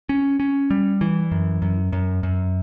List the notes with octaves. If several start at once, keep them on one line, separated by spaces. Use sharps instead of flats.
C#4
C#4
G3
E3
F#2
F#2
F#2
F#2